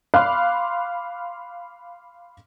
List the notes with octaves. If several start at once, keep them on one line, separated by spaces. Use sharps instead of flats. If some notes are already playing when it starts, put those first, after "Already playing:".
F5 B5 C6 D6 F6 F#6